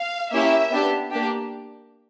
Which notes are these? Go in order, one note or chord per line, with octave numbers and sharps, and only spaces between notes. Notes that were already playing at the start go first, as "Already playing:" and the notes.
Already playing: F5
A#3 C#4 E4 G4 E5
B3 D4 G4
A#3 D4 G4